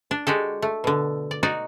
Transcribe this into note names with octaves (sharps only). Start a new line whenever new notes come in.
D4
G#3 F#4 G4 A4
A3
B2 D3
D5
D#4 F#4 D5